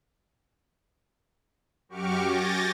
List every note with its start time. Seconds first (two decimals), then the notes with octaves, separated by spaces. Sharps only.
1.89 F#2 F#4 G4 C#6 D6 F6
2.25 G#5 D6 G6 A6 A#6